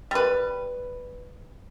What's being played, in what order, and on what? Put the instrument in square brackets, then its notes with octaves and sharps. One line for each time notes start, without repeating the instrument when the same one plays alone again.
[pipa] G3 B4